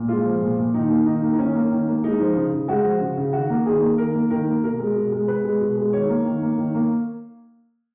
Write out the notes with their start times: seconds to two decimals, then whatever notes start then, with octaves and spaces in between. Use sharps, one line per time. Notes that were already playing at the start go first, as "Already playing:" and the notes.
Already playing: A#2
0.08 G#3 F4
0.25 F3
0.42 A#2
0.58 A#2
0.74 D#3 D#4
0.90 A#3
1.06 D#3 D#4
1.23 A#3
1.33 D#4
1.38 D#3 C#4
1.55 A#3
1.71 D#3
1.88 A#3
2.04 G#3 D#4
2.20 F3
2.36 C#3
2.53 C#3
2.68 G#3 F#4
2.85 F3
3.00 C#3
3.17 C#3
3.33 D#3 F#4
3.50 A#3
3.66 D#3 G#4
3.82 A#3
3.98 D#3 A#4
4.15 A#3
4.30 D#3 A#4
4.48 A#3
4.64 B2 A#4
4.79 G#3
4.96 B2
5.12 G#3
5.28 B2 B4
5.45 G#3
5.61 B2
5.77 G#3
5.93 D#3 C#5
6.09 A#3
6.26 D#3
6.42 A#3
6.58 D#3
6.74 A#3